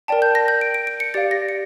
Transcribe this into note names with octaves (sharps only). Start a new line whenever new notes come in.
A#4 D5 G5 A5
G6
A#6
G6
D7
D7
D7
C#7
G4 D5 F5 A6
A#6
C#7